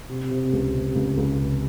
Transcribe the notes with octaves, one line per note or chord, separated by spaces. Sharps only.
C3
C3
C#2
C3
C#2
C#2
C3